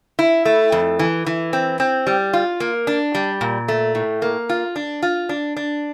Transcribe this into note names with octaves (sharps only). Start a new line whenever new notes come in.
E4
A3
F2
E3
E3
C4
C4
G3
F4
A#3
D4
G3
A#2
A3
A2
A#3
F4
D4
F4
D4
D4